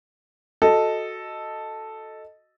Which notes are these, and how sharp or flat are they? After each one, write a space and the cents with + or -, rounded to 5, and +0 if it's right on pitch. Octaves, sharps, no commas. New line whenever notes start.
F#4 +0 A4 +0 D#5 +0